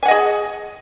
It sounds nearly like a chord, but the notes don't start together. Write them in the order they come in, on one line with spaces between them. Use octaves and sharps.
G#5 F#5 D#5 G#4